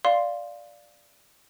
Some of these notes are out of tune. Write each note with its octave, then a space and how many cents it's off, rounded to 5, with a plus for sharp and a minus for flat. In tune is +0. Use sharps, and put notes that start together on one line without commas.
D5 +0 F5 +0 C6 +0